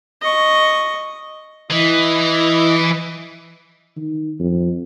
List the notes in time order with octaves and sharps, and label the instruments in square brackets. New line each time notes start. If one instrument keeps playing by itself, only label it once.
[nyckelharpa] D#5 C#6
[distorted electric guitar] E3 [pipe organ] E4 D#5
[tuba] D#3
F2